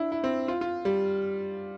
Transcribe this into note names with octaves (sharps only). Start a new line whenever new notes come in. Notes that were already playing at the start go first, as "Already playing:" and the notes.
Already playing: D4 E4
E4
C4
F4
F4
G3